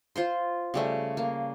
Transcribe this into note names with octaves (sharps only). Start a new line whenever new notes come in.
F4 C5 C6
C#3 G3 A3
A#3